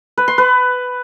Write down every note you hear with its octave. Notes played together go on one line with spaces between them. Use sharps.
B4
C6
B4